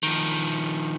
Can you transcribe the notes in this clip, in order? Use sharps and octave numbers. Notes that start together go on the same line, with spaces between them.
D#3 F3